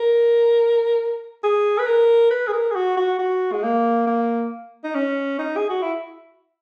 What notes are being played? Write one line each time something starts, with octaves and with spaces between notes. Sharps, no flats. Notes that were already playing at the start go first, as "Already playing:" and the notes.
Already playing: A#4
G#4
B4
A#4
B4
G#4
A#4
G#4
F#4
F#4
F#4
G#3
A#3
A#3
D#4
C#4
D#4
G#4
F#4
E4